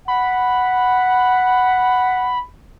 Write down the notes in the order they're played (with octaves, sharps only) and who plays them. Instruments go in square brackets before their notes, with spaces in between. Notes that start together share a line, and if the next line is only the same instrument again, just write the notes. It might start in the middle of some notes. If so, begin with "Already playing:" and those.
[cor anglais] F#5 [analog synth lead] B5